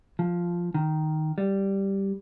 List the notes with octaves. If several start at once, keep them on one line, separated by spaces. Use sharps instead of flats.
F3
D#3
G3